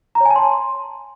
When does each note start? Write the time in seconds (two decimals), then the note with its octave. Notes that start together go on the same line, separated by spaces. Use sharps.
0.15 A#5
0.20 C#5
0.25 G#5
0.31 A5
0.36 C6